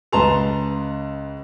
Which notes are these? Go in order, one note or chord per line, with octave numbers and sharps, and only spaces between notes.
C#2 B4 A5 A#5 C6 F7